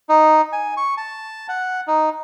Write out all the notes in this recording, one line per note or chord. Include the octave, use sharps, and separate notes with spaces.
D#4
G#5
C#6
A5
F#5
D#4